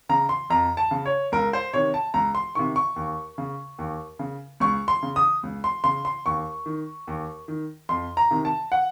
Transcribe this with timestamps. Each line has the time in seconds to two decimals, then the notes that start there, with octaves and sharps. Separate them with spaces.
0.09 C#3 A#5
0.29 C6
0.50 F2 A#5
0.77 A5
0.91 C#3
1.06 C#5
1.32 C#2 A#4
1.53 C5
1.73 C3 D#3 C#5
1.94 A5
2.14 C#2 A#5
2.35 C6
2.55 C3 D#3 C#6
2.76 C#6
2.96 D#2
3.38 C#3
3.79 D#2
4.19 C#3
4.60 C#2 C#6
4.88 C6
5.03 C#3
5.16 D#6
5.43 C#2
5.64 C6
5.84 C#3 C6
6.05 C6
6.26 D#2 C#6
6.66 D#3
7.07 D#2
7.48 D#3
7.89 F2 C6
8.17 A#5
8.31 C3 D#3
8.45 A5
8.72 F#5